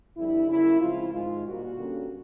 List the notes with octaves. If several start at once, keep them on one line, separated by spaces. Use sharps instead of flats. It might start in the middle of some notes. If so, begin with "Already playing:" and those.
F2 D3 G3 E4
C#3 F#3 A#3 C#4 E4
C#3 F3 G#3 C4 F4
G#2 D#3 G#3 F4
A#2 G3 A#3 F#4
D3 G3 A#3 C#4